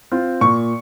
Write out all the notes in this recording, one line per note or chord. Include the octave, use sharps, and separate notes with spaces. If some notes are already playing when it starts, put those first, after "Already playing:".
C4 F4
A#2 C#6